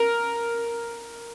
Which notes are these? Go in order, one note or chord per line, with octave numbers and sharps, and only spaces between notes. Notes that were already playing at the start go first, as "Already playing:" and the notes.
Already playing: A#4